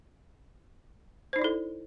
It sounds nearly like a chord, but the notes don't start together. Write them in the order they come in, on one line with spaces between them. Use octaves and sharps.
C5 D#4 D5 E4 A4